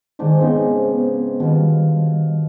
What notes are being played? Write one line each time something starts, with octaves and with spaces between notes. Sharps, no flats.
G#2 D#3 D4 D#4 C5
C#3 B3 C4 D#4 C6
B3
B2 D#3 G3 F4